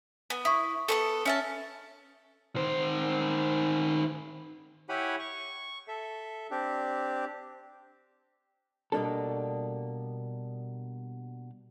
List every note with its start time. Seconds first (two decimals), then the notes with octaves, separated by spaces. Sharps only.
0.30 B3
0.45 E4 C#6 D#6
0.88 B3 C#4 A4
1.25 C#4 E5 A5
2.56 D#3 C5
4.89 E4 G4 C#5 F#5 G#5 B5
5.19 C#6
5.88 A4 E5
6.51 C4 D4 G4
8.92 B2 G3 A#3 D4 A4